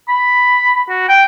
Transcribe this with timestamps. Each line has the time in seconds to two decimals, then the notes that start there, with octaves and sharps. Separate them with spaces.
0.09 B5
0.89 F#4
1.09 G5